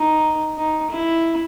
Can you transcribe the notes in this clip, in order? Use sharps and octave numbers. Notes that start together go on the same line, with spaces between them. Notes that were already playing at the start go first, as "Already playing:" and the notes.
Already playing: D#4
D#4
E4